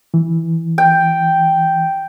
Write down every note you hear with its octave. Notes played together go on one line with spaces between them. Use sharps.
E3
G5